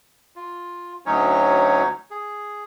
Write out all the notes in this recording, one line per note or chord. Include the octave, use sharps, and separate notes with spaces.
F4
D2 F#3 C#4 D#4 C#5
G#4